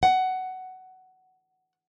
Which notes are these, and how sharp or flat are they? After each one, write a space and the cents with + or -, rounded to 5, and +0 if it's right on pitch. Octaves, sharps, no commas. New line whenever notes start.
F#5 +15